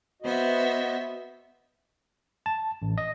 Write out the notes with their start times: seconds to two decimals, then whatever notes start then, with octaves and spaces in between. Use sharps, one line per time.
0.22 B3 F#4 C5 D#5 E5
2.46 A5
2.82 A1
2.98 D#5